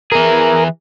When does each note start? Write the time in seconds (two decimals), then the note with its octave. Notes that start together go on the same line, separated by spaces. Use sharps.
0.12 E3 G#4 A#4